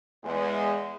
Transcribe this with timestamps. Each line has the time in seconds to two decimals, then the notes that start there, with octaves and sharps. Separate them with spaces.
0.24 E2 G#3